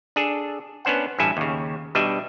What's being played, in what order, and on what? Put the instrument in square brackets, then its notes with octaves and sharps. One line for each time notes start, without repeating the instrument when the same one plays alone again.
[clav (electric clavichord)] D4 G#4 A4
B3 C#4 D4 C5 F#5
A1 G2 E4 A4 G#5
D#2 C#3
B2 G3 D4 D#5 E5